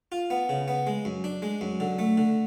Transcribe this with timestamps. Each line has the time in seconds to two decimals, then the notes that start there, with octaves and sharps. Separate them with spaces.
0.12 F4
0.30 B3
0.49 C#3
0.68 B3
0.87 G#3
1.05 F#2
1.24 D4
1.42 G#3
1.61 F#2
1.80 D3
1.99 A3
2.17 D3